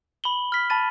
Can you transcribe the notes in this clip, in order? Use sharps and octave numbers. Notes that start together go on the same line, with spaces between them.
B5 F#7 G7
F6 B6
A5 B5 A6 D#7